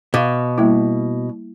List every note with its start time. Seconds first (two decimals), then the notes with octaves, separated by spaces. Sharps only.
0.14 B2 F5 D6
0.58 G3 A#3 E4